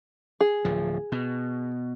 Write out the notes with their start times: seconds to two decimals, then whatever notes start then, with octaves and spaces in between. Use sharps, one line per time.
0.41 G#4
0.65 D1 F3
1.12 B2